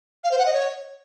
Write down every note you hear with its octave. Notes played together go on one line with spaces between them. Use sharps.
F5
C5
F#5
D#5
C#5